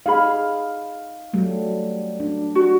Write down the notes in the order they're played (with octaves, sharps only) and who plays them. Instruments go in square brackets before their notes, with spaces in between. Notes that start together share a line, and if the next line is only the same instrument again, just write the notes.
[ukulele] D#4 G#4 B5 [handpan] F5
[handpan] F#3 G3 A3
D4
[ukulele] F#4